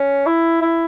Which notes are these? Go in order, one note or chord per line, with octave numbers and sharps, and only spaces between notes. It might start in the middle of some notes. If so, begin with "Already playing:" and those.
Already playing: C#4
E4
E4